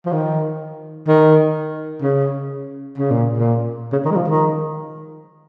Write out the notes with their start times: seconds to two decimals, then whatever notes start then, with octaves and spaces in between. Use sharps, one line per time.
0.06 F3
0.13 D#3
1.08 D#3
2.02 C#3
2.98 C#3
3.11 A#2
3.38 A#2
3.92 C#3
4.05 D#3
4.11 G#3
4.16 F3
4.28 D#3